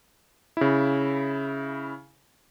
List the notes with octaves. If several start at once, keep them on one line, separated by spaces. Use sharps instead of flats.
C#3 E4